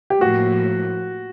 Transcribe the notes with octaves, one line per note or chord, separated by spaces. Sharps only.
G4
A2 F3 A#3 F#4